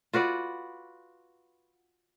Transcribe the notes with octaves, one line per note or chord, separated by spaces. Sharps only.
F4 F#4 B4 D5